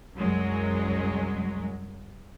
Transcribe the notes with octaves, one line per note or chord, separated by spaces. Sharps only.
C2 F#2 F#3 G#3